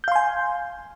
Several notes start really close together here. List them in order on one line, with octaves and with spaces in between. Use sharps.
G6 F5 C6 G#5